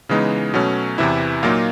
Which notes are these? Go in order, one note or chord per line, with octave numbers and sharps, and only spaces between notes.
C#3 E3 G#3 B3 D#4
B2 F#3 A3 C#4
E2 C3 E3 E4 E5
A#2 F#3 A#3 D#4 F4 F5